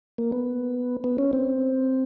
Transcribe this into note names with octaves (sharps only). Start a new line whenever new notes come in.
A#3
B3
B3
C#4
C4